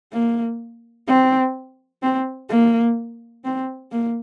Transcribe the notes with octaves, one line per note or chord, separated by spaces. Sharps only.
A#3
C4
C4
A#3
C4
A#3